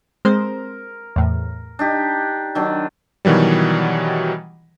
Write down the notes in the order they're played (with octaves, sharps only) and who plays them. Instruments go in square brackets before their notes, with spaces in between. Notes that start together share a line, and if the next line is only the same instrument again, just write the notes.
[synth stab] G#3 C4 C5 [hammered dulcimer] A#4
[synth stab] E2 A2
[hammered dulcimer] D4 D#4 G4
D#3 F#3 D4
[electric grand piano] B2 D#3 E3 F#3 G3